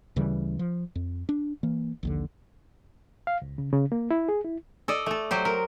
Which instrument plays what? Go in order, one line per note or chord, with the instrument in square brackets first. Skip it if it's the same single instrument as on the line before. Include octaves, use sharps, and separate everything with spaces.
[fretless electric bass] D2 C#3 E3 G3
F3
F2
D4
E3 A#3
A#1 D#2 D3
[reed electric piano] F5
C#2
C#3
C#3
A#3
E4
G#4
E4
[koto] A4 D5 D#5
A3 A4
F#3 G4 C5
A#4